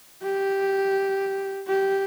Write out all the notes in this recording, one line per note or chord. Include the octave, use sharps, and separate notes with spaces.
G4
G4